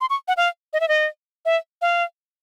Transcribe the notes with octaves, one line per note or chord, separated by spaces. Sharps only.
C6
C#6
F#5
F5
D#5
E5
D#5
E5
F5